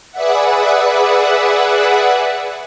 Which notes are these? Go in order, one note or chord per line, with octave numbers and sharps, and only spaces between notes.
G#4 B4 D5 E5 F#5